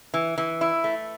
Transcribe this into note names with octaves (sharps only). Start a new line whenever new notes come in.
E3
E3
E4
A3